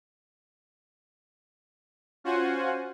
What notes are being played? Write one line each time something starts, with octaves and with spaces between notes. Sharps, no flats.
C#4 F4 F#4 C5 F#5 G#5